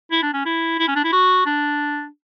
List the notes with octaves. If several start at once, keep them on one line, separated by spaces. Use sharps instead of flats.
E4
D4
C#4
E4
E4
C#4
D4
E4
F#4
D4